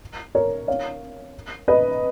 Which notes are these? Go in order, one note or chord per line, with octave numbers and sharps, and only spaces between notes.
A#4 C#5
C#5 F5
B4 D#5